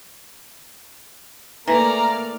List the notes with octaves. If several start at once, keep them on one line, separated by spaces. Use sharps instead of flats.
E3 A3 A#3 D5 A#5 F6